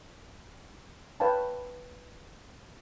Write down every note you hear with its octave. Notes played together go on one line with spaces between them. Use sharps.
B4 C#5 F5 G5 A5